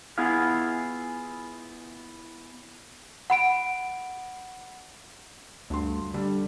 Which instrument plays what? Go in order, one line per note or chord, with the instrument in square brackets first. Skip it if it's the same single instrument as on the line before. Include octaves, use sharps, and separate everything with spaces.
[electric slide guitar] B3 E4 F4 G#4 F5
[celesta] F#5 B5 D7
[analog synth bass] D2 [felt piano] G2 C6
[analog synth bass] D3 [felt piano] G3